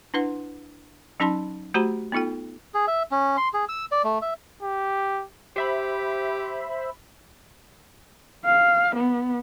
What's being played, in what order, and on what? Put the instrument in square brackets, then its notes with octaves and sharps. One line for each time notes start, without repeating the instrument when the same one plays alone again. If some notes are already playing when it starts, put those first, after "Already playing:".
[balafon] D4 E4 B4 F#5 C6
F#3 C#4 D#4 A5 B5 C6
A3 F#4 G4 C5 A#5 B5
B3 D#4 F4 A4 G5
[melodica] G#4
E5
C#4
C6
G#4
E6
D5
A3
E5
[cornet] G4
[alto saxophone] G4 [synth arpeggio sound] C5 E5 B5
[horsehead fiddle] F5
B3